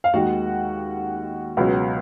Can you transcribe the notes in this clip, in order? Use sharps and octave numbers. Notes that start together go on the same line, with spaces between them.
F5
D#2 D#3 G#3 F#4 F#5
C#2 B2 F#3